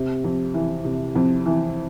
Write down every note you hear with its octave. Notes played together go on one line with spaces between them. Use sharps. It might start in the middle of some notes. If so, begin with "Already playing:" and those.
Already playing: C3
F2
E3
C3
F2
E3